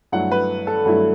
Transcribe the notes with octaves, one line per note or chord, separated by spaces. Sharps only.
G2 F#3 A3 E4 F#5
B4
A4
G2 F#3 A3 E4